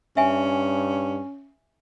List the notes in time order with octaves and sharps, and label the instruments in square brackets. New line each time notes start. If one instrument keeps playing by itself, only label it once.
[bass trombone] G2 [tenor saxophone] C#4 [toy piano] E5 G#5